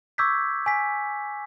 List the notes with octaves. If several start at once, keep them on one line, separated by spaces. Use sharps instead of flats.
C#6 D6 E6 G6 G#6 B6
G#5 B6